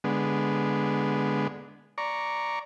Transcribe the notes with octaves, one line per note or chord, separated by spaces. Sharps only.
D3 G#3 B3
D5 A#5 C#6